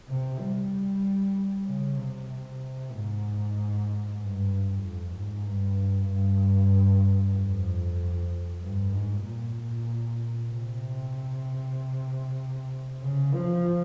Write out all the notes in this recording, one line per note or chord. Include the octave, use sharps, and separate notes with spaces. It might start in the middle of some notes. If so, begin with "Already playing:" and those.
C3
G3
C#3
C3
C3
G#2
G2
F2
G#2
G2
G2
F2
G2
G#2
A#2
C3
C#3
F3